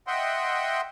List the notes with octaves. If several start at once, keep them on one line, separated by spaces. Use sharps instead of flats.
D#5 E5 F#5 G5 C6